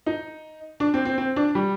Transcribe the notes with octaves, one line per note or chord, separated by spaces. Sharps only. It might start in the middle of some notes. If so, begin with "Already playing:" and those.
D#4
D4
C4
C4
C4
D4
G3